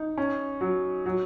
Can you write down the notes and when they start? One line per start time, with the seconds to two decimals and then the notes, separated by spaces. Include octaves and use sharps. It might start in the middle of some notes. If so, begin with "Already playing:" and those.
Already playing: D#4
0.18 C#4
0.61 F#3
1.06 F#3